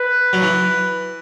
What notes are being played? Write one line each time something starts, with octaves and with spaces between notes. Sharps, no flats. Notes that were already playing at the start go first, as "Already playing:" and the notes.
Already playing: B4
F#3
E3